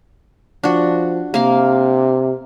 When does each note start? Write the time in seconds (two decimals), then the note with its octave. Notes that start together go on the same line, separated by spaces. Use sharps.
0.63 F3 D4 F#4
1.34 C3 A#3 F5